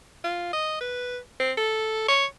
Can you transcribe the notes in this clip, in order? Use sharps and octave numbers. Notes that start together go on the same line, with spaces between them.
F4
D#5
B4
C4
A4
C#5